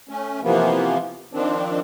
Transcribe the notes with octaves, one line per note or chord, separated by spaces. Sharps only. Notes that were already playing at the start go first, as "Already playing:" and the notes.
A3 C#4
C3 E3 F3 A#3 B3
D#3 F3 C4 D4